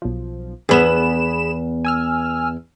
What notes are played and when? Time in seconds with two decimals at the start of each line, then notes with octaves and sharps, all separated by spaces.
0.02 B1 F3
0.69 E2 B3 G#4 B5 E7
1.85 G#5 E6 F6